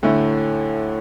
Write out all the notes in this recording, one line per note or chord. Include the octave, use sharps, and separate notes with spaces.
D2 A2 D3 A3 E4